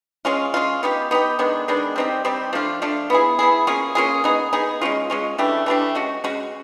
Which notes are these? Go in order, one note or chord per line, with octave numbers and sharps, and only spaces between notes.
G#3 C#4 F4
G#3 C#4 F4
B3 D#4 G4
B3 D#4 G4
D#3 G#3 B3 D4
D#3 G#3 B3 D4
G3 C4 D#4 G4
G3 C4 D#4 G4
F3 A3 D4 F4
F3 A3 D4 F4
B3 E4 G#4
B3 E4 G#4
A#3 C#4 F4 G#4
A#3 C#4 F4 G#4
B3 D#4 G#4
B3 D#4 G#4
G#3 C#4 F4
G#3 C#4 F4
E3 A3 D4 G4
E3 A3 D4 G4
G#3 C#4 F#4
G#3 C#4 F#4